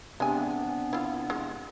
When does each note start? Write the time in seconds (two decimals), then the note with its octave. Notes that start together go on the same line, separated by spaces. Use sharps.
0.20 C3 G#3 B3 C4 D4 G#5
0.93 E4 F4
1.30 G#3